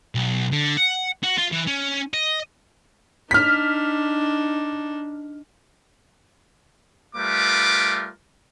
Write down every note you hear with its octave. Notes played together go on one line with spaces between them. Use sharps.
B1
D3
F#5
F#4
F4
E3
C#4
D#5
D4 D#4 F6 B6
G3 A3 F4 A#4 B4 D6